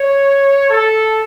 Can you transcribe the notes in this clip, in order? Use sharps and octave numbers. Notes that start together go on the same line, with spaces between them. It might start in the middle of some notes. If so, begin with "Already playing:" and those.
Already playing: C#5
A4